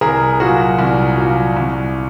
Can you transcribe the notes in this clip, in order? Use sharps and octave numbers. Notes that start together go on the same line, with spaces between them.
C2 G#4 A#4
A#2 F#3 F#4 G#4
C2
A#2 F#3
C2